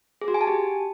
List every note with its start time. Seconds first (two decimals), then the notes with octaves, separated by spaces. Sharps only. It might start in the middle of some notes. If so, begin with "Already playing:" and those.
0.21 G#4
0.28 F#4
0.34 G#5
0.41 A5
0.47 G4